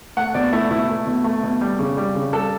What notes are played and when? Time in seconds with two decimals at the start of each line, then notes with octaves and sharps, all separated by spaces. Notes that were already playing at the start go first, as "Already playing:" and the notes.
0.17 A3 F#5
0.34 B2 D5
0.53 A3 E4
0.71 B2 E4
0.89 A3
1.07 B2
1.24 A3
1.43 B2
1.61 G3
1.79 C#3
1.97 G3
2.15 C#3
2.33 G3 A4